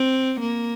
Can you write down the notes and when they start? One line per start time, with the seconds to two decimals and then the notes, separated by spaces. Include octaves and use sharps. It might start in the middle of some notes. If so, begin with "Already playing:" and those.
Already playing: C4
0.41 A#3